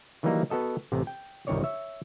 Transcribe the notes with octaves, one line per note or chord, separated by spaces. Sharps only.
D#3 E3 F#3 G3 A#3 D#4
B3 F#4 A4 D#5
A1 C3
G5
G1 C2 D#3 C4 C#5 D5
C#5 E5